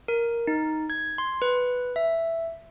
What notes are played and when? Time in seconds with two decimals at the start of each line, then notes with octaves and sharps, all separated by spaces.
0.08 A#4
0.47 D#4
0.90 G#6
1.18 C6
1.42 B4
1.96 E5